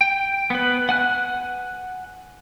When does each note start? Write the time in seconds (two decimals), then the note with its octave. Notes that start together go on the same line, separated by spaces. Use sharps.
0.01 G5
0.50 B3 B4
0.89 F#5 G#5 F#6